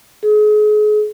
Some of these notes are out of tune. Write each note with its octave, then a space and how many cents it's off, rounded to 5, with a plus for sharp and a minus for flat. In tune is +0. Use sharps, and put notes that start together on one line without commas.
G#4 +35